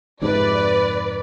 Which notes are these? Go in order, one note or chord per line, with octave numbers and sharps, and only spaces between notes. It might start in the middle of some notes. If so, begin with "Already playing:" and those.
F2 G#2 C3 B4 D5